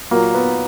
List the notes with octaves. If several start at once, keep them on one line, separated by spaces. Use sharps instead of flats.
A#2 F#3 A#3
B3